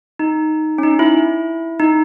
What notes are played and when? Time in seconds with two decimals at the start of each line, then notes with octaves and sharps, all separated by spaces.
0.19 D#4
0.78 C#4
0.83 D#4
0.99 E4
1.79 D#4